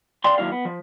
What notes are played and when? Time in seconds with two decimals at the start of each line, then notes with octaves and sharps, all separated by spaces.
0.24 D5 F5 G5 C6
0.38 D#2 F#3 E4 F5
0.52 B3
0.65 F3